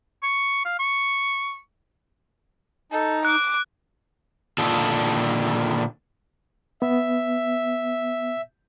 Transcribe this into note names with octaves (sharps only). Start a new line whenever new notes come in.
C#6
F5
C#6
D#4 A4
D6 F#6
A#2 D3 D#3 A4
B3 E5